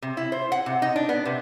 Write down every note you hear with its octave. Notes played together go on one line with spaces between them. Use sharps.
C3
E4
C5
F#5
C3
D#4
D4
B3
C3